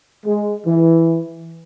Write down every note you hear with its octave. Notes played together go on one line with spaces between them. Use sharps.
G#3
E3